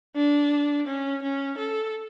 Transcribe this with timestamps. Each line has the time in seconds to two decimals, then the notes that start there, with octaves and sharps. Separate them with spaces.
0.16 D4
0.87 C#4
1.22 C#4
1.58 A4